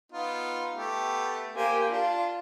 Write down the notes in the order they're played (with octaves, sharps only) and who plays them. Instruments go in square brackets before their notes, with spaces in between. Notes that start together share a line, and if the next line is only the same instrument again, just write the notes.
[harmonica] B3 D#4 F4
A3 B3 G4
[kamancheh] A#3 G4 [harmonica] C5 G#5
[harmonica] D4 [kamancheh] F4